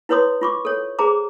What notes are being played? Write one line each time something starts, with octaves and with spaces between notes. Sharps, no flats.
E4 B4 C#5 C6 D#6
F4 C#6 D6
A4 C#5
G#4 C5 A#5 D6